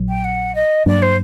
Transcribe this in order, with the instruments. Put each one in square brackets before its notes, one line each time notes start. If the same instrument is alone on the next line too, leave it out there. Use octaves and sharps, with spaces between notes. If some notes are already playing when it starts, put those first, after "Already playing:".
Already playing: [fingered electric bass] A#1 A#2 F#3
[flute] G5
F#5
D#5
[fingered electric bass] G2 F#3 A#3 D4 [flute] D5
[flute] C5